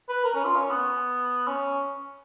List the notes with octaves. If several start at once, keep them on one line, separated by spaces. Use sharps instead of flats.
B4
A#4
C#4
F4
C#4
B3
C#4